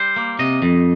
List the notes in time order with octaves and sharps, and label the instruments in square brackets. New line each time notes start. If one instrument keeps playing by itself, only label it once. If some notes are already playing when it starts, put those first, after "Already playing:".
Already playing: [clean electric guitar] G3 C5
A#3
C3 D#5
F2